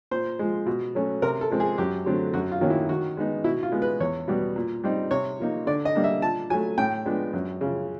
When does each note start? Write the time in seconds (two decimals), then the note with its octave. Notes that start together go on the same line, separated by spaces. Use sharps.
0.11 A#2 C5
0.39 F3 G#3
0.66 B2
0.95 F#3 A3 C#4
1.22 C3 A#4
1.41 A4
1.51 F3 G#3 C4
1.60 G#4
1.78 F#2 G4
2.06 D3 F#3 A3 C4
2.34 F#2 F#4
2.52 F4
2.61 D#3 F#3 A#3 C#4
2.70 E4
2.89 D#3 F#4
3.17 G#3 B3 D#4
3.44 B2 E4
3.63 F4
3.72 G#3 B3
3.82 B4
4.00 E2 C#5
4.28 B2 G3 B3
4.56 A#2
4.84 G3 C4 D#4
5.11 C3 C#5
5.39 F3 A#3 D#4
5.67 D3 D5
5.85 D#5
5.95 G3 A#3 D4
6.04 E5
6.22 A#2 A5
6.50 F#3 A3 G#5
6.78 A2 G5
7.06 F3 G#3 B3 D4
7.33 F#2
7.61 C#3 F3